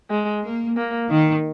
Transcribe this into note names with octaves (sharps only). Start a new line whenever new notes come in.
G#3
A#3
A#3
D#3